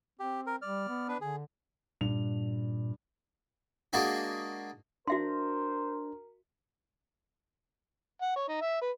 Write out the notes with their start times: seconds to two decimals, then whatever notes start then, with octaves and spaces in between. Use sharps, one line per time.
0.20 C4 G4
0.47 A#4
0.62 G3 D5 F6
0.88 B3
1.08 D4 B4
1.21 D3 G#4
2.01 G2 A#2 F7
3.93 G#3 A#3 D4 F#4 G#4
5.08 D4 F#4 A#4 C5 E5 C6
8.22 F#5
8.36 C#5
8.48 D#4
8.61 E5
8.82 B4